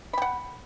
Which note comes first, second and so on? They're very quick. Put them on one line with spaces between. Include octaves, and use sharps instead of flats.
B5 G5 F#5